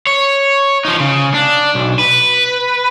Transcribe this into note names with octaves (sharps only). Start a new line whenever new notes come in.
C#5
F3 D#4
C#3
D4
B1
B4